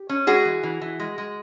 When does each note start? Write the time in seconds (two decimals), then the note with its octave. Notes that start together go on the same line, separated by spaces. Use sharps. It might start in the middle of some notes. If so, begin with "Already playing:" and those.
Already playing: G4
0.09 C#4
0.27 G#3 F#4 G#4
0.45 E3
0.63 E3
0.81 E3
1.00 G#3
1.18 G#3